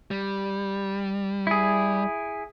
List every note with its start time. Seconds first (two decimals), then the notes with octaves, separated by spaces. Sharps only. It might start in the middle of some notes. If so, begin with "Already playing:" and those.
0.11 G3
1.47 E4 G#4